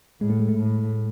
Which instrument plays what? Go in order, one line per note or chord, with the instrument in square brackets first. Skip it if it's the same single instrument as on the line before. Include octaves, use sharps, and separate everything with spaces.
[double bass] A2 [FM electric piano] G#3
[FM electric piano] A3
G#3
A3
[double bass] A2